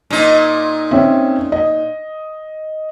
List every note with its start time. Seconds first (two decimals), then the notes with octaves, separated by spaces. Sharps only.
0.10 A#2 D#4
0.91 C4 C#4 E5
1.52 D#5